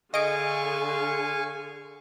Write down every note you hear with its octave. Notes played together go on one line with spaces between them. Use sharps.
D3 G#4 D#5 F5 G#5 C#6 D7